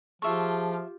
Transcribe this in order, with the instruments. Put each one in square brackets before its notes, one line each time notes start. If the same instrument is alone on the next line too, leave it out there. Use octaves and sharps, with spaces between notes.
[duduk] F3 [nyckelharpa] F4 G4 [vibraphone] G#4 A5 [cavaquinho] E5 C#6